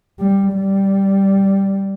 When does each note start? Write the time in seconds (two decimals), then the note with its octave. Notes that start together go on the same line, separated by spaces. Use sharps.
0.20 G3
0.55 G3